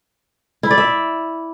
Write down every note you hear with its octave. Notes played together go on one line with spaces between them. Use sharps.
E4
D5
E5